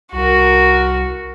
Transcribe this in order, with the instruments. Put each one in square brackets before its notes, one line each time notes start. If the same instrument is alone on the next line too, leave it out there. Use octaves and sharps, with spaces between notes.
[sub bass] C2 [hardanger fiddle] F#4 A#4